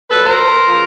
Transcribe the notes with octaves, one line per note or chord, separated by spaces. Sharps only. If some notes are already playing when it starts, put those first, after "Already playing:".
A#2 F#3 A4 B4
A#4 C5
C#3 F3